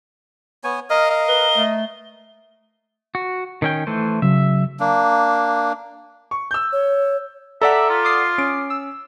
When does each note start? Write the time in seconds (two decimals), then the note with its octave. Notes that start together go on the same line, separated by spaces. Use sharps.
0.64 B3 C#5 G#5
0.90 A#4 D#5 F5 F6
1.10 D#5
1.29 B4 G7
1.57 A3
3.15 F#4
3.62 D#3 C#4 G5
3.87 E3 A3 C5
4.22 C#3 F#3 E5
4.80 A#3 D4
6.31 C#6
6.51 E6 G6
6.72 C#5
7.62 A4 D5 E5 F#5 A#5 D6 B6
7.90 F4
8.04 D6 D#6 C7
8.38 C#4 D7
8.70 E6